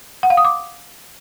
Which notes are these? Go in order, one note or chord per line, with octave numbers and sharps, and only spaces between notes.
F#5
F5
D#6
D6